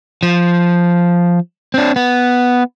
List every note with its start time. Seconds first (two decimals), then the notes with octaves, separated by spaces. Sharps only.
0.23 F3
1.74 C4 D4
1.96 B3